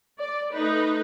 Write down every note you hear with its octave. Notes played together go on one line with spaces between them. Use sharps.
D5
A3 D#4 B4